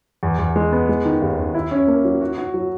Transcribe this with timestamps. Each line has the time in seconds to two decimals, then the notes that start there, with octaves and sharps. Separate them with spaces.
0.23 E2
0.39 E2
0.56 G#3
0.72 B3
0.89 G#3
1.05 D#3
1.22 D#2
1.38 D#2
1.54 E4
1.71 C#4
1.88 A#3
2.05 F#3
2.21 F#4
2.38 F#4
2.54 F#3